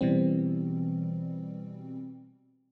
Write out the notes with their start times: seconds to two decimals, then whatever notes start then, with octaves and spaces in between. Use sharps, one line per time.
0.01 B2 E3 G3 C4